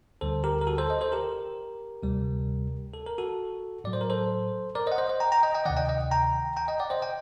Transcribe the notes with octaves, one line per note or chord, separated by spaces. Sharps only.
D2 D3 G3 A4 C5
G4 A#4
A#4
F#4 A4
A4 C5
C5 D#5
A4 C5
G4 A#4
D2 C3 G3
A4
A#4
F#4 A4
A2 F#3 D5
C5
A#4
A4 C5
A#4 D5
C5 D#5
F#5
C5 D#5
C5 D#5
G5 A#5
G5 A#5
D#5 G5
D#5 G5
D2 C3 D#3 D5 F#5
D#5 G5
D#5 G5
G5 A#5
G5 A#5
D#5 G5
D5 F#5
C5 D#5
D#5 G5